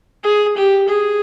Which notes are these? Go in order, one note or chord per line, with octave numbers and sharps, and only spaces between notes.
G#4
G4
G#4